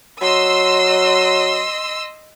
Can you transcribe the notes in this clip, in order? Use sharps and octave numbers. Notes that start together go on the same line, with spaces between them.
F#3 D#5 C6 E6